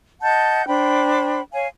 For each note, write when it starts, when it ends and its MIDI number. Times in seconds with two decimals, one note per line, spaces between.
0.22 0.65 75
0.22 0.65 78
0.22 0.65 81
0.22 0.65 91
0.67 1.41 62
0.67 1.41 72
0.67 1.41 79
0.67 1.41 83
1.53 1.67 73
1.53 1.67 77
1.53 1.67 80